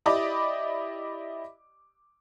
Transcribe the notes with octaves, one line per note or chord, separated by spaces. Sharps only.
E4 G4 D5 D#5 B5 D6